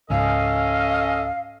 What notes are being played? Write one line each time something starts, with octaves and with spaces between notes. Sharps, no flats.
C#2 G#2 C#4 A4 D#5 F5